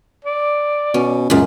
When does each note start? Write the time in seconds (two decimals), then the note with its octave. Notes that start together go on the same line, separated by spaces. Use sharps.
0.25 D5
0.94 B2 C#4
1.30 C#2 F#2 A#2